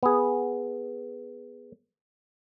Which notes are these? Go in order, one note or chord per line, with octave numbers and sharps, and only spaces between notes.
B3 G#4